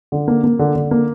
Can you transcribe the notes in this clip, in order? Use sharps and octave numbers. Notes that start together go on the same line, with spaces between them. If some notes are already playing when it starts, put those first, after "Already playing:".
D3
A#3
A#3
D3
D3
A#3